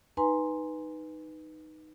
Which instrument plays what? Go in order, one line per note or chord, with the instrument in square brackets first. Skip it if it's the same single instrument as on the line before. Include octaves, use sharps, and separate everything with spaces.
[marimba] D#4 B4 G#5 A#5 C6